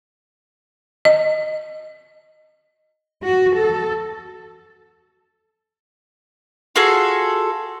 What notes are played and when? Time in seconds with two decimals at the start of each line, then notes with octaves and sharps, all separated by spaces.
1.05 D#5
3.23 F#4
3.56 A4
6.76 F4 F#4 G#4 A4